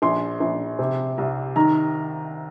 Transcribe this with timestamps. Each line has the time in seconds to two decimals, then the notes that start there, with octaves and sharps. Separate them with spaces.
0.02 A#1 C6
0.40 A#1
0.79 C3
1.18 C2
1.56 D#3 A#5